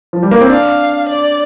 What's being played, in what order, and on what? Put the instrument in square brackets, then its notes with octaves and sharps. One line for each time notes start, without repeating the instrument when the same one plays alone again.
[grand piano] F3
G3
A#3
C4
[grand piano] D4 [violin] F5
[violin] D5